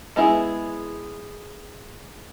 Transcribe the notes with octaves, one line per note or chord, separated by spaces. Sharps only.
G#3 B3 E4 G#4